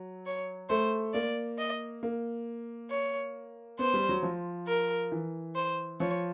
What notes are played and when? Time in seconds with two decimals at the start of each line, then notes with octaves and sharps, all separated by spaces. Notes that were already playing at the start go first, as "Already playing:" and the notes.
Already playing: F#3
0.26 C#5
0.69 A3 C5
1.14 A#3 D5
1.58 D#5
2.03 A#3
2.90 C#5
3.79 B3 C5
3.94 G3
4.09 F#3
4.23 F3
4.67 A#4
5.12 E3
5.56 C5
6.00 F3 C#5